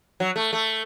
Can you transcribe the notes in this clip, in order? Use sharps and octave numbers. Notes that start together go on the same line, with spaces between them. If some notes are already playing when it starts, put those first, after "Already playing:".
F#3
A3
A3